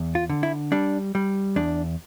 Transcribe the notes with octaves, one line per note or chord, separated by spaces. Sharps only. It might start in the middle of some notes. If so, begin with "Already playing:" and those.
Already playing: E2
F4
D3
E4
G3 D4
G3
E2 D4